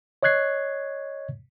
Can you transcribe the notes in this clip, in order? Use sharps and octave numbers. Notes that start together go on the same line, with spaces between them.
C#5 D#5 C#6 F#6 G#6 C7